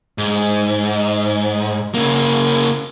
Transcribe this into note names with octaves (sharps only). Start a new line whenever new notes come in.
G#2
C#3 A#3